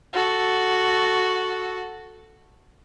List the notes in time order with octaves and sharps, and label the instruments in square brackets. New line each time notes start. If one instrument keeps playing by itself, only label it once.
[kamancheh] F#4 A4